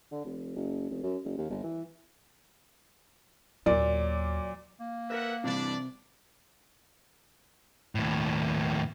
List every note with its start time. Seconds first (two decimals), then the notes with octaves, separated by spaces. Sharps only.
0.11 D3
0.25 F1
0.56 F#1
0.90 F1
1.03 F#2
1.25 F#1
1.37 D#2
1.50 G1
1.64 E3
3.66 D#2 A#2 F#3 B3 D5
4.80 A#3
5.10 A#4 B4 E5 F#5
5.44 G2 C3 E3 G3 D4 D5
7.95 D#2 A2